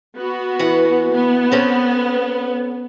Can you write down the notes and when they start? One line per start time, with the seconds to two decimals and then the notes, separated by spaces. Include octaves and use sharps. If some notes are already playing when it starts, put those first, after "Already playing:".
0.16 B3 F#4
0.59 E3 B4 F#5
1.13 B3
1.52 C4 C#4 A4